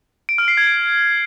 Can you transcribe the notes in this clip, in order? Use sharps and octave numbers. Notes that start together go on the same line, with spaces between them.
D7
F6
C7
G#6
D7